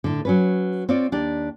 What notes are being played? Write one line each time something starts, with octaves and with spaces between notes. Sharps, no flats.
A2 D3
F#3 C#4 B4
C4 F4 C#5 D5
D#2 D4 G4 D5